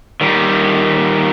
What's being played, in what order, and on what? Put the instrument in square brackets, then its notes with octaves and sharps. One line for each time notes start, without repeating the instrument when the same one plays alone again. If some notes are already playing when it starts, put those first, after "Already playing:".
[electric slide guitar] D#3 G3